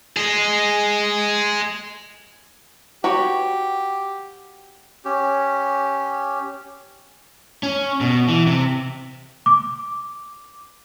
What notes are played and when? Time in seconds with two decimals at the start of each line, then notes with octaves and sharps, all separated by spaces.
0.17 G#4 D#5
3.04 F#4 G4 B4 C#5
5.05 C#4 G4
7.63 C#4
8.01 B2
8.28 E3
8.47 C3
9.46 D6